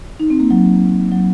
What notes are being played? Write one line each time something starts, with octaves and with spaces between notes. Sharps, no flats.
D#4
C4
A#3
F#3
F#3